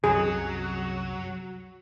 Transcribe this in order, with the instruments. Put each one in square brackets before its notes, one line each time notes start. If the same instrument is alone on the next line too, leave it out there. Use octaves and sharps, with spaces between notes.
[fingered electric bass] C2 F#2 C3 [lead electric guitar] F#3 [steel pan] G#4